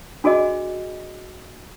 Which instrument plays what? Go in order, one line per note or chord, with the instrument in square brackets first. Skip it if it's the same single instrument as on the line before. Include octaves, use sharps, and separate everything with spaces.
[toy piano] D4 F#4 G#4 D5 D#5